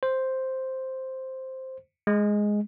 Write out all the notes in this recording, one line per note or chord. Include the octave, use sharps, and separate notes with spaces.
C5
G#3